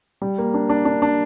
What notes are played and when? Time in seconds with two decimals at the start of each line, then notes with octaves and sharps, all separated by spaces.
0.22 G3
0.38 A#3
0.54 D4
0.69 D4
0.85 D4
1.02 D4